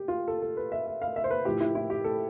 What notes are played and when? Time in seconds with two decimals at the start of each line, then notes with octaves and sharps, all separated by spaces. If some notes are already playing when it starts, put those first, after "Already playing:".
Already playing: G4
0.08 F4
0.28 A4
0.42 A4
0.57 B4
0.72 E5
0.87 E5
1.02 F5
1.16 E5
1.24 C5
1.31 B4
1.45 A2 F3 G4
1.60 E4
1.75 E4
1.90 G4
2.04 A4